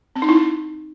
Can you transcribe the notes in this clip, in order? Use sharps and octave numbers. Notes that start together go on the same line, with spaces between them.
C4
D#4
E4